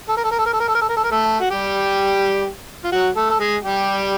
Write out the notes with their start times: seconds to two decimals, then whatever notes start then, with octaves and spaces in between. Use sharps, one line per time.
0.09 A4
0.17 A#4
0.24 A4
0.31 A#4
0.39 A4
0.46 A#4
0.53 A4
0.60 A#4
0.68 A4
0.75 A#4
0.82 A4
0.89 A#4
0.97 A4
1.04 A#4
1.11 A3 A4
1.40 F#4
1.50 G3 G4
2.84 F4
2.92 F#3 F#4
3.16 A3 A4
3.30 A4
3.39 G#3 G#4
3.63 G3 G4